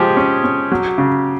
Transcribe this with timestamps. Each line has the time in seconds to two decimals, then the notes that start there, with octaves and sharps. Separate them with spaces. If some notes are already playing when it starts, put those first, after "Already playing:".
Already playing: F3 G#3 G4 G#4
0.17 C#4
0.44 C#4
0.72 F#3
0.98 C#3